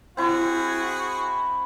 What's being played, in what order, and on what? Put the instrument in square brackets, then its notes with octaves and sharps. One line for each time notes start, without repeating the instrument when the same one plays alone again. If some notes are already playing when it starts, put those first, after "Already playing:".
[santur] C4 E4 [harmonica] F#4 G#4